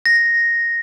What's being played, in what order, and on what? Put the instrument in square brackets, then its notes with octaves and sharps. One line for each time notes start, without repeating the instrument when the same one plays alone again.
[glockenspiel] A#6